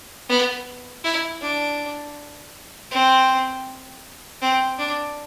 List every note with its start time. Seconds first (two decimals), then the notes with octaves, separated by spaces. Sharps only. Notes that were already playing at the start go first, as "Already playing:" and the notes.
0.29 B3
1.04 E4
1.42 D4
2.91 C4
4.42 C4
4.79 D4